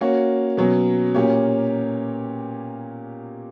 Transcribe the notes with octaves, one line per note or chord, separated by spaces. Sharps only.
A#3 C#4 F#4 C#5
B2 F#3 C#4
A#2 A#3 C#4 G4 C#5